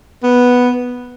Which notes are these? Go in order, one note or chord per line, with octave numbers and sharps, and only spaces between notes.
B3